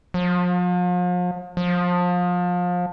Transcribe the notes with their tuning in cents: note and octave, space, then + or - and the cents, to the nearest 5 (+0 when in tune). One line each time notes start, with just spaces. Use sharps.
F3 +40
F3 +30